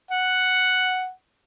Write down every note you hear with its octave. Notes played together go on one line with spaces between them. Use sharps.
F#5